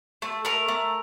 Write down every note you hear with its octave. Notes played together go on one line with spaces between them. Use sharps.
A3
A3 A#4
A3